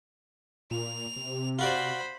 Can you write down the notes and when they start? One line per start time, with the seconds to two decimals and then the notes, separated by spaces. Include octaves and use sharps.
0.71 A#2 F7
1.16 C3
1.59 F4 F#4 C5 D5 B5